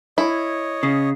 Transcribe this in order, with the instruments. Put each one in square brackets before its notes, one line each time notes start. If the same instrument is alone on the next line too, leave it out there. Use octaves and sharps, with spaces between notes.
[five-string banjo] E4 [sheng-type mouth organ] C#5 D#5
[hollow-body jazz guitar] C#3